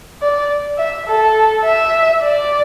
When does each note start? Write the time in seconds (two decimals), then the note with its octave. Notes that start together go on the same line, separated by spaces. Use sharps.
0.22 D5
0.78 E5
1.07 A4
1.65 E5
2.23 D5